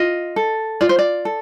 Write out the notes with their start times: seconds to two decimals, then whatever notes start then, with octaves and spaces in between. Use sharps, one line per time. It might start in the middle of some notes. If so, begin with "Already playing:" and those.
Already playing: F4 D#5
0.36 A4
0.81 F4 D5
0.89 C5
0.99 D5
1.25 A4